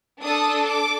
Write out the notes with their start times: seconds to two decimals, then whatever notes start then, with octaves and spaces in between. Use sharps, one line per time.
0.21 D4 A4 D#6
0.65 D6